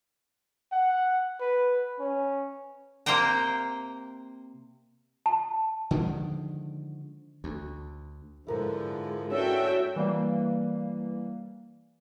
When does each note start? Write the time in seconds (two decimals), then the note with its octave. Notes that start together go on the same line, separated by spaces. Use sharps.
0.72 F#5
1.41 B4
2.00 C#4
3.06 C3 A#3 C5 G5 A#5
5.26 A5
5.91 D3 D#3 F3 G#3
7.44 D2
8.47 G#2 D3 F3 G#3 E4 A#4 B4
9.30 C#4 D4 F#4 A4 B4 E5 G5
9.96 E3 G3 A#3